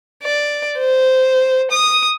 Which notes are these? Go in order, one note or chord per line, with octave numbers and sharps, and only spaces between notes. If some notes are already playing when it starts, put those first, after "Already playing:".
D5
C5
D#6